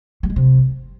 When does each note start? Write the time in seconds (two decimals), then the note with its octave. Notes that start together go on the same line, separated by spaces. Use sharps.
0.23 G3
0.30 G#3
0.36 C3